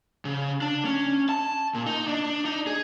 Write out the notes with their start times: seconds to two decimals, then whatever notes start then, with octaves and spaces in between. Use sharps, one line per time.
0.25 C#3
0.61 D4
0.85 C#4
1.29 A5
1.75 A#2
1.86 D#4
2.08 D4
2.45 D#4
2.67 G#4